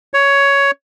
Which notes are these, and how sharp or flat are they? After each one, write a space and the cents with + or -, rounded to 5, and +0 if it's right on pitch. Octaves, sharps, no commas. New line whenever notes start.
C#5 +10